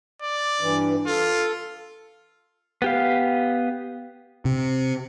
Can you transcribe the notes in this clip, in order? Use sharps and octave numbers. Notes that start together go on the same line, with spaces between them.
D5
G2 E3
F4 A4
B3 G4 F5
C3